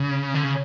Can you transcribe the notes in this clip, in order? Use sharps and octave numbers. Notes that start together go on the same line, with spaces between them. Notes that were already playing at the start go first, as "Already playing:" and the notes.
Already playing: C#3
D3
C#3